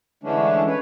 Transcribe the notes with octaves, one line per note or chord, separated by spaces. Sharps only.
D3 E3 G#3 A3 C#4 D4
B4 C#5